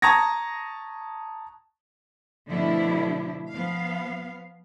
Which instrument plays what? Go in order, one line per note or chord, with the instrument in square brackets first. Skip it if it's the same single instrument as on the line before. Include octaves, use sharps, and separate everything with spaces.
[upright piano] A5 A#5 C#6 D#6 G#6 A#6
[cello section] B2 D3 F3 A3 D4 E4
F3 B3 F5